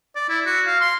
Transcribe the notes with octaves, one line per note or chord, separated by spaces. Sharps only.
D5
E4
F#4
F5
C6